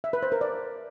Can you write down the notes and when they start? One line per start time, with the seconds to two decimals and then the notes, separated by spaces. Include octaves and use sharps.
0.04 E5
0.13 B4
0.23 C5
0.32 A#4
0.41 D5